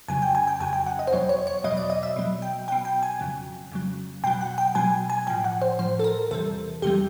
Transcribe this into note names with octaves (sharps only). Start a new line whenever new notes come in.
F2 C#3 F#3 G#5
G5
G#5
G5
F2 C#3 F#3 G#5
G5
F#5
D#5
C5
E2 B2 F#3 C#5
C#5
C#5
E2 B2 F#3 D#5
D5
D#5
E5
B2 F#3
G5
B2 F#3 G5
G5
G#5
F2 C#3 F#3
F2 C#3 F#3
B2 F#3 G5
F#5
G5
B2 F#3 G#5
G#5
A2 F3 G5
F#5
C5
A2 F3 C5
A4
A#4
E2 C3 E3 G3 A4
E2 C3 E3 G3 G4